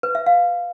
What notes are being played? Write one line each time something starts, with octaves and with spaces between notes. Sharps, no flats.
B4
E5
F5